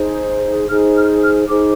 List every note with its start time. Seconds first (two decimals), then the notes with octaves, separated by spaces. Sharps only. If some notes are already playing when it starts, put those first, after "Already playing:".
Already playing: D#4 G#4 C5
0.69 D#4 G#4 C5 F6
0.97 F6
1.22 F6
1.48 D#4 G#4 C5 D6